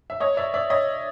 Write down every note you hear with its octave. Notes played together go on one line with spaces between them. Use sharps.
E5
C#5 D#5
D5 E5
D5 E5
C#5 D#5